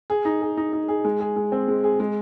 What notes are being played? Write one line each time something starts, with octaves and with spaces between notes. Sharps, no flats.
G#4
D#4
G#4
D#4
D#4
G#4
G#3
G#4
G#3
C4
G#3
G#4
G#3